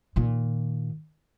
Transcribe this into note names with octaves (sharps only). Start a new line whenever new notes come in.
A#2 D#3